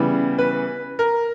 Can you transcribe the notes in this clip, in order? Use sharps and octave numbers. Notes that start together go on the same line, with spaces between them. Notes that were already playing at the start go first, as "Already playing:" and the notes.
Already playing: C#3 E3 G3 B3
B4
A#4